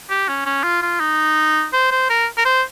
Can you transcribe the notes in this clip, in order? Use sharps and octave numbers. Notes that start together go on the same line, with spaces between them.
G4
C#4
C#4
F4
F4
D#4
C5
C5
A#4
A#4
C5